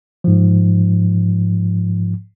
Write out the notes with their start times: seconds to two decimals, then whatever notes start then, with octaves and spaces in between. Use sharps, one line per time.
0.24 G#2 F3